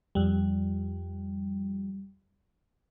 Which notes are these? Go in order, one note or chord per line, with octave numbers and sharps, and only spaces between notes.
F2 G3